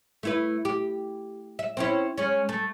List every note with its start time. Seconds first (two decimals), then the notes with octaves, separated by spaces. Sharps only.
0.23 A3 E4 B4
0.65 G4
1.59 E5
1.77 C4 C#4 E4
2.18 G#3 C#4
2.49 A3